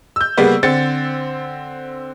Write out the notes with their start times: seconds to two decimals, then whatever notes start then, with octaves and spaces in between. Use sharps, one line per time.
0.16 E6 G6
0.37 C#3 G3 A#3 B3
0.63 D3 C4 A6 C#7